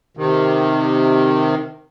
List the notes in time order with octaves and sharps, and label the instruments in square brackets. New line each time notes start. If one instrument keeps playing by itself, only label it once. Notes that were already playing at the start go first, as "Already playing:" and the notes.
[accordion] C3 D#3